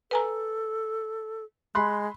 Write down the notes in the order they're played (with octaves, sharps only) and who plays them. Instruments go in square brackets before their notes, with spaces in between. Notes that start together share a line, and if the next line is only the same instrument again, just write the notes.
[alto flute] A4 [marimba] B4 G#5 A#5
[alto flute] G#3 [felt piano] B5 C6 F#6